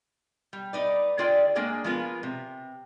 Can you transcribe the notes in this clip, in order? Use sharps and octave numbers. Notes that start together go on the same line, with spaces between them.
G3
D#4 B4 D5
D3 D4 F4 G#4 D5 G5
G#3 A#3 D4 G#4 C#5 G5
F3 G#3 B3 F4 A#4 B4
C3